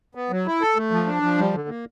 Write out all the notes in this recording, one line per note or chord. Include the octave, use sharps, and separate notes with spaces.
B3
F#3
E4
A4
A3
F3
D4
F3
G3
D3
A#3